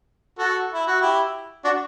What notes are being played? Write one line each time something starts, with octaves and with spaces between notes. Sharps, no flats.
F#4 A4
E4
F#4
E4 G4
D4 F#4